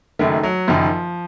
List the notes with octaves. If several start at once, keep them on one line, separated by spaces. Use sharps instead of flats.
F#1 F#2 D#3 A3
F#3
F#1 F#2 D#3 F3